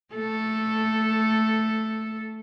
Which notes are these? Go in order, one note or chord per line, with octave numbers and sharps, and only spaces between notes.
A3 A4